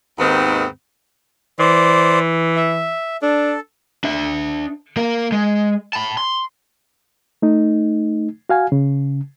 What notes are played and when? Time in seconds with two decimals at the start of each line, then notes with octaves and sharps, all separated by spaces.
0.19 D#2 G#2 D#3 B3 C4
1.59 E3 C5 D5
2.56 E5
3.22 D4 A4
4.04 D4 E5
4.97 A#3 A#4
5.32 G#3
5.93 A5 B5
6.17 C6
7.42 A3 D#4
8.49 F#4 F5 G#5
8.72 C#3